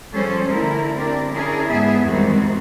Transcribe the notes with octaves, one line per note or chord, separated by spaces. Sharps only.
F3 G3 C#4 G#4 A4 C5
D3 A3 E4 A#4
C4 D4 G4 A#4 D5
C#4 D4 E4 G#4 A#4
G#2 B3 G#4 E5
E2 G#2 D#3 G3 C4 F#4